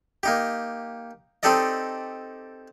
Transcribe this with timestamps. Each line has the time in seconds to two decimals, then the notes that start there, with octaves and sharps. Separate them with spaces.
0.23 A#3 D#4 G4
1.43 C4 D#4 G4 A4 D5 D#5